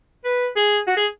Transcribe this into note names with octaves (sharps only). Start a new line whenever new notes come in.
B4
G#4
F#4
G#4